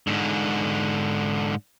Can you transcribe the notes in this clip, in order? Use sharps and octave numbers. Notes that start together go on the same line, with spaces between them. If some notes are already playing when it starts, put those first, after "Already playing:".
G#2 D3